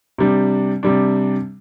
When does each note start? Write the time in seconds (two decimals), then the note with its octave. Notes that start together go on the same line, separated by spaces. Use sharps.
0.18 C3 G3 D4
0.83 C3 G3 D4